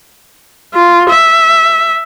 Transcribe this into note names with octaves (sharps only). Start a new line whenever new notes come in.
F4
E5